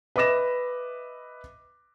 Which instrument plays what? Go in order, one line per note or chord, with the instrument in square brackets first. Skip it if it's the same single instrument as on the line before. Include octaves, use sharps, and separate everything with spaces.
[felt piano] B4 D#5 E5 D6 A#6 E7